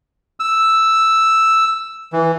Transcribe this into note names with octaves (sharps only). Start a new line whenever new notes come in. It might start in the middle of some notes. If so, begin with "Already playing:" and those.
E6
E3